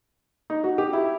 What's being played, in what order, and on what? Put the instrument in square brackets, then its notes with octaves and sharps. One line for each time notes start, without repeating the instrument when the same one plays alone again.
[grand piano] D#4
F#4
G4
E4